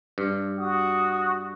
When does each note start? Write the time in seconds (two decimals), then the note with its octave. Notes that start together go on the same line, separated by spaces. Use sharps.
0.18 G2
0.59 F#4 D#6